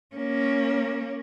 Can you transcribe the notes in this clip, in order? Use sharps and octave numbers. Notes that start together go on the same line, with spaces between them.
A#3 C#4